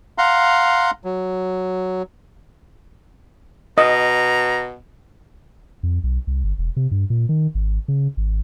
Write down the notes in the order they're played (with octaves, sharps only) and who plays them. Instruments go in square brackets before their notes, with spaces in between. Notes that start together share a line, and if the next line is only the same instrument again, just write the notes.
[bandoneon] F5 F#5 A#5 C6
F#3
[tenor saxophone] B2 [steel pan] D#5 [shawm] A#5
[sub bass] F2
B1
C2
G1
E1
C3
G2
A#2
D#3
G#1
C#3
G#1